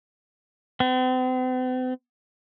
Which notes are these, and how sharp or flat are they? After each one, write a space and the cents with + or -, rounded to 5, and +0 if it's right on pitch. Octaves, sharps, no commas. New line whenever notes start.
C4 -45